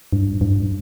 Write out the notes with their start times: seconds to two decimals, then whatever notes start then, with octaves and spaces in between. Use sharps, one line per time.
0.13 G2
0.41 G2